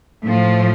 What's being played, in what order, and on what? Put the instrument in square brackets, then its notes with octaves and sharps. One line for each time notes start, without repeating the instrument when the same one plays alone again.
[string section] A2 F3